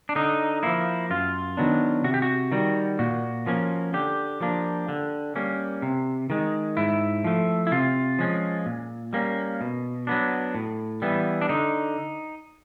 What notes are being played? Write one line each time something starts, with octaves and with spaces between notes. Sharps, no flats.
D4
D3 D#4
F3 A#3 E4
F#2 F4
D#3 F#3 B3 D4
C3 F#4
G4
F#4
D#3 G3
A#2 F#4
F3 A#3 C#4
D3 G4
F3 A#3 D4
D3
G3 A#3 C#4
C3
D#3 G#3
G#2 E4
F3 A3
E4
C3 F4
F3 G#3 C#4
A#2
G3 A#3 C#4
B2
F#3 B3 D4
A2
E3 G3 B3
D4
D3 D#4